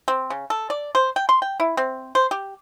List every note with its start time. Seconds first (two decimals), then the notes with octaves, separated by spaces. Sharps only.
0.08 C4
0.30 C#3
0.50 A4
0.70 D5
0.95 C5
1.16 G5
1.29 C6
1.42 G5
1.60 E4
1.77 C4
2.15 C5
2.31 G4